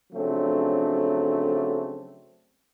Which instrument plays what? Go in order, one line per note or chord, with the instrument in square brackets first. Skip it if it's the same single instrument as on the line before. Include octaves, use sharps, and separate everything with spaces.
[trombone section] C#3 F3 F#3 A3 C4 D4